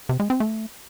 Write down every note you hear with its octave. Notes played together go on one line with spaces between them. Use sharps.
C3
G#3
C4
A3